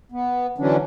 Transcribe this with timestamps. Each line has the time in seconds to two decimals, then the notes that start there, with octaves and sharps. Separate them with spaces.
0.12 B3
0.58 D3 E3 F#3 C#4 D4